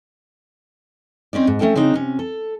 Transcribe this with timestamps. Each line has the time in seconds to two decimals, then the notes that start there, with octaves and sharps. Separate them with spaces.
1.33 C4 C#4 D#4 D5
1.47 G#2
1.59 A3 C#4 A4 G5 A5
1.75 C#3 C4 D4 D#4
1.94 C3 C#4
2.19 A4